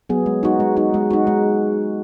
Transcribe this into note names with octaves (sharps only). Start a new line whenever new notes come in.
F#3 B3 G#4
G#3
D#4 F#4
G#3
D#4 F#4
G#3
D#4 F#4
G#3